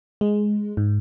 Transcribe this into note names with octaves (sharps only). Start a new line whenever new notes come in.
G#3
G#2